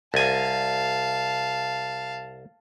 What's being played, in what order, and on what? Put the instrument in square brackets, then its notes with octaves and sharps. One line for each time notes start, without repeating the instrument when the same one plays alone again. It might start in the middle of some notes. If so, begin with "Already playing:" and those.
[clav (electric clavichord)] C2 G#5 [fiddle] F5 A5